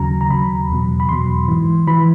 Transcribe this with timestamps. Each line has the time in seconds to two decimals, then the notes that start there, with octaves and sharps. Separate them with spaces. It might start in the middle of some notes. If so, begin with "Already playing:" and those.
Already playing: D#2 C#3 F#3 A#5
0.21 A#5
0.30 D#2 C#3 F#3 B5
0.70 E2 B2 F#3
1.00 B5
1.09 E2 B2 F#3 C6
1.48 G#2 E3
1.87 E3 B5